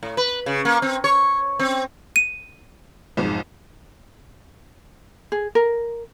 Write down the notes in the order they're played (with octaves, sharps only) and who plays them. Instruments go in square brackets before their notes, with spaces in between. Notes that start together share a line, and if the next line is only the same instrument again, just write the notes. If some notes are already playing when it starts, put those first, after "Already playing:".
[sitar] A2
B4
C#3
A#3
C4
C#5
C4
[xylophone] D#7
[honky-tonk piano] B1 F2 G#2
[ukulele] G#4
A#4